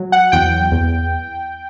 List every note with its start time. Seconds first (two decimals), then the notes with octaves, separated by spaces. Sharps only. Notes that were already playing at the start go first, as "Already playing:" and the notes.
Already playing: F#3
0.12 F#5
0.32 E2 G5
0.72 E2